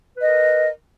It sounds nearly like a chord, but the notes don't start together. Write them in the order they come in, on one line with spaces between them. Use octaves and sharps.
B4 D#5 A#4